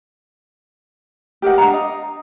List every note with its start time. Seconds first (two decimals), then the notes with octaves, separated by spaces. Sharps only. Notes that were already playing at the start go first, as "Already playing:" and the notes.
1.42 G4 A#4 D#5 F#5
1.58 D4 F5 F#5 A#5
1.74 D#5